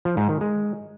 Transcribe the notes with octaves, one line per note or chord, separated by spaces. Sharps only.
F3
G#2
D#3
G#3